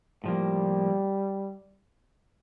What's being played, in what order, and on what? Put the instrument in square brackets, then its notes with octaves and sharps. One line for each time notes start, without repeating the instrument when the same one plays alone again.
[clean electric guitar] A2 F3 A#3 [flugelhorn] G3